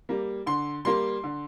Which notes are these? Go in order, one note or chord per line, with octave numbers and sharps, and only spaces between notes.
G3 A#3
D3 C6
G3 A#3 C6
D3